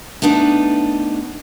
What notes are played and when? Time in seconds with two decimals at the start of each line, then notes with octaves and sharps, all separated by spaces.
0.22 A3 B3 D4 D#4